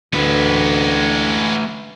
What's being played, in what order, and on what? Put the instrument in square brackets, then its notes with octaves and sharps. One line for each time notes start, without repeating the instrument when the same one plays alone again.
[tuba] D2 [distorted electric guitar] G#3 B3 [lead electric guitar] A3 B4